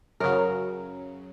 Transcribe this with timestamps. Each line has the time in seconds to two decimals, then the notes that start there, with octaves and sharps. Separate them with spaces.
0.20 F#2 C#3 F#3 A#4